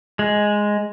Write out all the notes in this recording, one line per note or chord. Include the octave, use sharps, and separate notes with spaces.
G#3